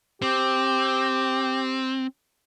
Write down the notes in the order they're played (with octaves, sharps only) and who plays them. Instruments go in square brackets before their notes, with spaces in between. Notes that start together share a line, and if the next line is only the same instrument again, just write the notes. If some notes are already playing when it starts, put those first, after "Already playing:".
[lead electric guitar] C4 [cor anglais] G4